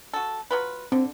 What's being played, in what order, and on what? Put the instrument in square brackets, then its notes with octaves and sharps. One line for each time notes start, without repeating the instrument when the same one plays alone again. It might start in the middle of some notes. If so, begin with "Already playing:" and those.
[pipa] F#4 A4
F#3 F4 B4
[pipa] D3 [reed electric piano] C4